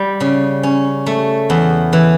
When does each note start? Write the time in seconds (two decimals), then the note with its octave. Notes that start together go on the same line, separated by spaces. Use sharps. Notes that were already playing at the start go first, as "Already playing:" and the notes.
Already playing: G3
0.20 C#3
0.63 C#4
1.06 A3
1.50 E2
1.93 E3